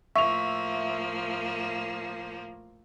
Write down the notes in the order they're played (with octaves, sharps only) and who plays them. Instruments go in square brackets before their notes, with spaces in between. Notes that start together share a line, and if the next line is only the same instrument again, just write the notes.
[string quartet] A2 F3 A#3 [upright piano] E5 F7 [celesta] C#6